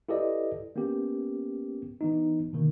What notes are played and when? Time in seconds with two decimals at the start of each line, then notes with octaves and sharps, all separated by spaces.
0.09 E4 G4 A4 B4 D5 D#5
0.76 A#3 B3 C#4 G4
2.01 E3 B3 D#4
2.53 B2 D3 D#3 A#3